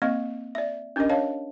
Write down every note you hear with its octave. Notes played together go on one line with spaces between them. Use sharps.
A#3 C4 D#5 C#6
D5 E5
C#4 D4 G4 A#4 D#5
C#5 D#5 F5 A5